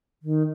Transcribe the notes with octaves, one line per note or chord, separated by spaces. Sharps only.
D#3